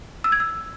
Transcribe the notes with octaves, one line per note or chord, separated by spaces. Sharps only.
E6
G#6
E6